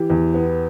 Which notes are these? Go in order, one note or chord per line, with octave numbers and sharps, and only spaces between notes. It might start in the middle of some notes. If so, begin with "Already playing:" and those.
Already playing: E3 G4
E2
B3